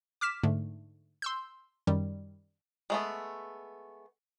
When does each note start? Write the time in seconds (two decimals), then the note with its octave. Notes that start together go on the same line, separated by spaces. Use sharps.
0.21 D6 F6 B6 E7
0.43 G#2 D3 A3
1.22 C6 E6 G6
1.87 F#2 D#3 G3
2.90 G#3 A3 B3